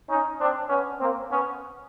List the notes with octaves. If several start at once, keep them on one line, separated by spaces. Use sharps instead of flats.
C#4 D#4
C4 D4
B3 C#4
A#3 C4
B3 C#4